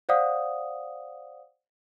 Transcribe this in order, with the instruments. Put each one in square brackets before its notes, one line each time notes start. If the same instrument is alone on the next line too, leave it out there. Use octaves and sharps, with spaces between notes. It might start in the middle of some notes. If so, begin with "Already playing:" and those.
[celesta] C5 D5 F5 F#5 D#6